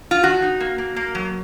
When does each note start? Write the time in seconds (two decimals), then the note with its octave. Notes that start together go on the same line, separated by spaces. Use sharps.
0.11 F4
0.23 D#3 F#4
0.42 D#4
0.60 A#3
0.78 A#3
0.96 A#3
1.15 F#3